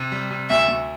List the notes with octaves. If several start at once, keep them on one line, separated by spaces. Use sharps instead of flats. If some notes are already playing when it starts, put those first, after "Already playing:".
Already playing: C3
G3
C3
D2 E5
D2